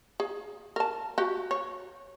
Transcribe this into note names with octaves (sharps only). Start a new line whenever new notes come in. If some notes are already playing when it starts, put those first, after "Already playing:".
G#4
A#4 A5
F#4 G4
C#5